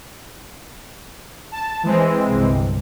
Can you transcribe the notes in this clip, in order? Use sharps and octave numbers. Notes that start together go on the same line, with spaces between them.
A5
E3 G#3 C4
G1 C2